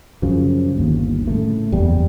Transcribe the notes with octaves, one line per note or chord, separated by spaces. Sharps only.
F#2 C#3 F3
G1 D#2
A2 C#3 A3
F#1 E2 G3